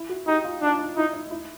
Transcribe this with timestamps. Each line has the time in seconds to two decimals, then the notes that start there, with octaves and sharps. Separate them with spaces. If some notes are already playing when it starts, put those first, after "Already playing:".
Already playing: E4
0.09 F#4
0.27 D#4 G4
0.44 F4
0.62 D4 D#4
0.79 D#4
0.97 D#4 E4
1.14 D#4
1.31 E4